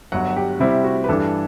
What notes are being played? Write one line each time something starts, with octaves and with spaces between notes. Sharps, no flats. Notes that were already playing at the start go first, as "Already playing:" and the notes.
G1 G2 F#3 F#5
G4
C3 G3 C4 E4
F#4
B4
G2 E3 G3 D4 A4